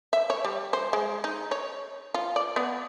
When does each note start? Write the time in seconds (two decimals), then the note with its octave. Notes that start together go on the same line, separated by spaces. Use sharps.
0.13 E5
0.30 C#5
0.45 G3
0.73 C5
0.93 G#3
1.24 D#4
1.51 C#5
2.14 F4
2.36 D5
2.56 B3